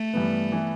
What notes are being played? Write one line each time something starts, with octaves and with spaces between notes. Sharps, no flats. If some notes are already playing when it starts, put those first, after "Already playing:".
Already playing: A3
G2 E3 B3
E3 B3 E4